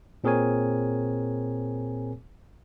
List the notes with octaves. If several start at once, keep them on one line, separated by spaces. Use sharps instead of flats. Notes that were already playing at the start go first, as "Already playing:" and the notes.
A#2 C4 G#4 A#4 C#5 G#5